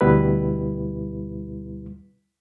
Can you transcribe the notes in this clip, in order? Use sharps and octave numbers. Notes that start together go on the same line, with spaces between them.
D2 B2 G3 B3 E4 B4